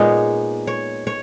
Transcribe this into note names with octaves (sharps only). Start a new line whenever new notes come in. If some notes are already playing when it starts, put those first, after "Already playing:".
Already playing: A#2 G#3 B3 D#4 C#5
C#5
C#5